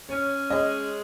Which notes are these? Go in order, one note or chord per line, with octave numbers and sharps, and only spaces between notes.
C#4 C#5
G#3 D#5